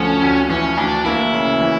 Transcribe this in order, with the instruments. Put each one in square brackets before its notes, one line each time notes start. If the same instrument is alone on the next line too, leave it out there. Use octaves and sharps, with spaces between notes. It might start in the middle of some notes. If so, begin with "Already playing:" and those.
Already playing: [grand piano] D2 D3 F3 A3 [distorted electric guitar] C#4
[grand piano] D2
[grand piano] E3 [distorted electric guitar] C#4
[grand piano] D2 [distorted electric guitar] D4
[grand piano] A#3 [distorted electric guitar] E4
[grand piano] C#3
E3